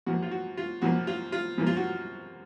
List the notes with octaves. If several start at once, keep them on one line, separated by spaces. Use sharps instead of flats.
F#2 F3 A#3 F#4
F4
F#4
F4
F#2 F3 A#3 F#4
F4
F4
F#2 F3 A#3
F4
F#4